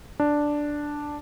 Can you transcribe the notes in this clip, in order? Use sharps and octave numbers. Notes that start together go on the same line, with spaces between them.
D4